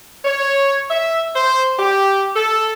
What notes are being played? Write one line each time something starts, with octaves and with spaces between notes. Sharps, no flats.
C#5
E5
C5
G4
A4